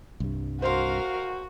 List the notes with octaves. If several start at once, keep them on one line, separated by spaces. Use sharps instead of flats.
C2 G2
F#4 A#4 C5 F5 C6